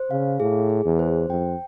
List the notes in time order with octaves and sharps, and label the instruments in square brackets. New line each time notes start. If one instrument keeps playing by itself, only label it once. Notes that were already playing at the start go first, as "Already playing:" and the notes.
Already playing: [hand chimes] C5
[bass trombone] C#3 [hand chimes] F5
[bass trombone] A2 [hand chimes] G#4
[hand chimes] G#4
[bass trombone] E2
[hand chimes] C5
[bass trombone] F2 [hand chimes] G5